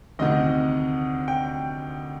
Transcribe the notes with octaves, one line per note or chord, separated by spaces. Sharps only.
D2 C3 D#3 D#5
G5